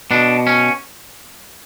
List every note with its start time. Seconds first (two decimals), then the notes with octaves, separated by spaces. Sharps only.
0.11 B2 D4
0.47 C#4